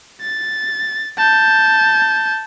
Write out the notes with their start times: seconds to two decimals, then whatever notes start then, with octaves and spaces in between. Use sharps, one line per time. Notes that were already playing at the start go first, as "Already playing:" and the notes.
0.22 A6
1.18 A5 G6